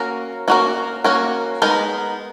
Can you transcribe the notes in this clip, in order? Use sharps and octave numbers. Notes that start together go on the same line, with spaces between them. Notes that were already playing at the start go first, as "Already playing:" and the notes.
Already playing: A#3 C#4 F#4 A#4
A#3 C#4 F#4 A#4
A#3 C#4 F#4 A#4
G#3 B3 D#4 A#4